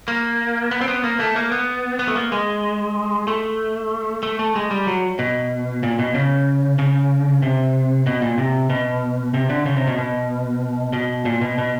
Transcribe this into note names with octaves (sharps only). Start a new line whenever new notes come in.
A#3
B3
C4
B3
A#3
A3
A#3
B3
B3
A3
A#3
G#3
A3
A3
A3
G#3
G3
F#3
B2
A#2
B2
C#3
C#3
C3
B2
A#2
C3
B2
C3
D3
C#3
C3
B2
B2
B2
A#2
B2
B2